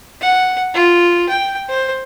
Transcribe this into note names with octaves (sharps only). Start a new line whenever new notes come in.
F#5
F4
G5
C5